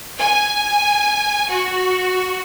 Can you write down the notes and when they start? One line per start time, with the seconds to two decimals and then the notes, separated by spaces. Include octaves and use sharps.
0.18 G#5
1.50 F#4